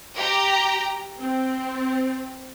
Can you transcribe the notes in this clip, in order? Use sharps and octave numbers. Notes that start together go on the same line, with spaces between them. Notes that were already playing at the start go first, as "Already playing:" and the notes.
G4 A#5
C4